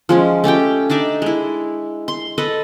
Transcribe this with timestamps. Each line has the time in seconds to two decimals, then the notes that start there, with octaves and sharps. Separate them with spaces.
0.09 F3 G#3 C#4
0.44 A3 C#4 G4 G5
0.90 D4 D#4 D5 E5
1.22 G#3 E4
2.08 C6
2.38 A4 B4 D#5